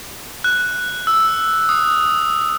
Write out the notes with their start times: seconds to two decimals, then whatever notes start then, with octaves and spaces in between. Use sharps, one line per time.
0.44 F#6
1.07 E6
1.69 D#6